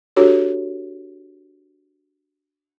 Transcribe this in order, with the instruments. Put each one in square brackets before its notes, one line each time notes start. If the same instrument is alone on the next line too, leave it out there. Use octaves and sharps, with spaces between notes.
[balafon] D4 F#4 G4 A4 C#5